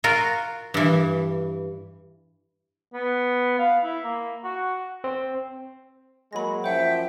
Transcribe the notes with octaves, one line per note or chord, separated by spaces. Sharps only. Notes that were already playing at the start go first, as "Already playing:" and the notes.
F4 F#4 A#4
G2 E3
B3
F5
E4
A#3
F#4
C4
F#3 G#3 A#3 B5 A#6
F#2 F3 C5 E5 F#5 G5